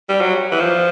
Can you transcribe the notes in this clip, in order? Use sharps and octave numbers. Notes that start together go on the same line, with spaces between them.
G3
F#3
E3
F3